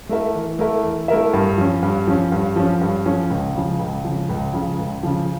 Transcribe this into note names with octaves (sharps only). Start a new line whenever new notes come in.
A3 E4 A#4 E5
E3
A3 E4 A#4 E5
E3
A3 E4 A#4 E5
G2
F3 C#4
G2
F3 C#4
G2
F3 C#4
G2
F3 C#4
C#2
C#3 F3
C#2
C#3 F3
C#2
C#3 F3
C#2
C#3 F3